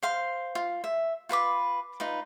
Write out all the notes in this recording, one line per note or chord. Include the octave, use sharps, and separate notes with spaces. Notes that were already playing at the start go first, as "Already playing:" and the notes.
C5 F5 C6
F4
E5
F4 B4 B5 D6
D#4 F4 B4